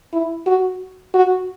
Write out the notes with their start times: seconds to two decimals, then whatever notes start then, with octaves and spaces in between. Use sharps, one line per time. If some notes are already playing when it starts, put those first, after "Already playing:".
0.13 E4
0.47 F#4
1.14 F#4